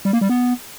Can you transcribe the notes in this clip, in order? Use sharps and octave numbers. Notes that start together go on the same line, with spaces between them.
G3
A#3
G3
B3